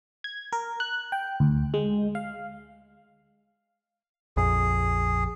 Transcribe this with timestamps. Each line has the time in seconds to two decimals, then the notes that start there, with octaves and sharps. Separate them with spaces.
0.24 G#6
0.53 A#4
0.80 F#6
1.12 G5
1.40 D2
1.74 G#3
2.15 F5
4.37 A#1 F2 G#4